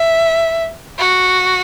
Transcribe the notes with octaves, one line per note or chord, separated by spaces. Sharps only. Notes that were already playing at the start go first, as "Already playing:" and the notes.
Already playing: E5
F#4